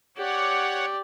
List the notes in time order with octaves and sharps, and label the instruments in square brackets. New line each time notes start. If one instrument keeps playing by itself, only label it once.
[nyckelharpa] G4 D5 [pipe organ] C#5 F#5